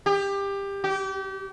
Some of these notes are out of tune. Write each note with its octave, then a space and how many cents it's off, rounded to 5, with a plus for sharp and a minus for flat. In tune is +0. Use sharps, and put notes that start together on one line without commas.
G4 +20
G4 -30